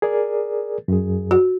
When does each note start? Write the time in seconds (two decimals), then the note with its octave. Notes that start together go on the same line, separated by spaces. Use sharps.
0.02 G#4 A#4 D5
0.88 F#2 G#4
1.31 F#4